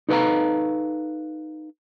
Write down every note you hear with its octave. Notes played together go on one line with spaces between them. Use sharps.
D#4 A4 B4 C#5 F5 A#5